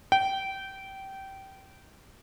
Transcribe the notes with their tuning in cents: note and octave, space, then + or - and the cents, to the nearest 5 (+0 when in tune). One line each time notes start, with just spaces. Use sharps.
G5 -20